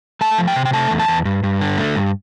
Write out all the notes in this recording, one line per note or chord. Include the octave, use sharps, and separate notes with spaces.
A3 A5
F3
G5
C3
G5
A3 A5
E2
A5
E2
G2
G2
D3
A3
G2